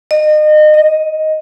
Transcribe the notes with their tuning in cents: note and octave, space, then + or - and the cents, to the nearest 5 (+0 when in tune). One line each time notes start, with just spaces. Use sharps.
D#5 -35
D#5 +5